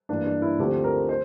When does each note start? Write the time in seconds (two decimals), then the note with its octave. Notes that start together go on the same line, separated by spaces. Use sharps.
0.09 G2 E3 A#3 D4
0.26 D4
0.42 E4
0.59 D2 D3 F3 A3 C4 G4
0.84 A#4
1.09 C5